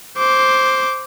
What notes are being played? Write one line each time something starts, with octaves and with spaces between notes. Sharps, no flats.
C5 D6